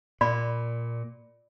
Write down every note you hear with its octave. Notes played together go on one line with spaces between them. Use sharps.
A#2 D5 B5